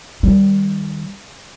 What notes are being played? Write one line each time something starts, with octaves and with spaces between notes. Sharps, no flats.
D#3 G3